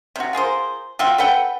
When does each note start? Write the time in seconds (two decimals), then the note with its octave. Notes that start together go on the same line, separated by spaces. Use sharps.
0.16 C3 F#4
0.33 F4 G#4 A#4 C5
0.99 F4 F#4 E5 G5
1.18 A4 B4 F#5 G5